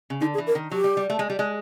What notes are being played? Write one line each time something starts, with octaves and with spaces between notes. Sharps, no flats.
C#3
D3 D#4
G#4
E3
A#4
D#3
F#3 G4
G3
G3
A3
G#3
G3
G#3